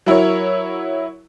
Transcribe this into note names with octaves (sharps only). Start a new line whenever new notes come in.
F#3 E4 A#4 C#5